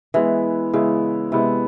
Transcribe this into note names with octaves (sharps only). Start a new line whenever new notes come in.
E3 G#3 B3 E4
C#3 G#3 B3 E4
C3 G#3 B3 E4